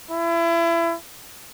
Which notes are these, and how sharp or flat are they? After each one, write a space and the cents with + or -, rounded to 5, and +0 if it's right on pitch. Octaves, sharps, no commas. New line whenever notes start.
E4 +30